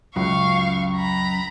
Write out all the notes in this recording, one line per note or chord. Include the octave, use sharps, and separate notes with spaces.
C#2 F#2 F5 C#6
A#5 B5